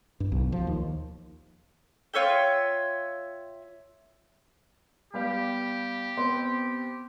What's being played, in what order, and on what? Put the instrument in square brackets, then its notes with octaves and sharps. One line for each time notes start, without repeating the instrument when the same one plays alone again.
[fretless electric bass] G2
B1
F3
D#2
[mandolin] F4 C#5 E5 G5
[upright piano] G3 B3 F5 [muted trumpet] G4
[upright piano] B3 C4 [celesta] C6